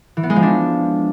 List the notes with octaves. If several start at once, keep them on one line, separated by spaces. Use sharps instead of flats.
E3
B3
G#3
F3
D4